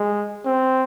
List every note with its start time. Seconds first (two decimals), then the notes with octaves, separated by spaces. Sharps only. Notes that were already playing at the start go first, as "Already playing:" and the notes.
Already playing: G#3
0.45 C4